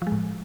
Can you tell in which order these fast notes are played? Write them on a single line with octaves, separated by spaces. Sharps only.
F3 G#3 A2